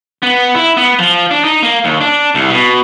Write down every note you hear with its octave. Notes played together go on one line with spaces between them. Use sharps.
B3
E4
B3
F3
D4
D#4
A#3
D#2
D4
C2
B2